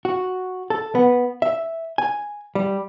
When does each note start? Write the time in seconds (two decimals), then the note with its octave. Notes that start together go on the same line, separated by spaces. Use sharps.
0.05 F#4
0.70 A4
0.95 B3
1.42 E5
1.98 G#5
2.55 G3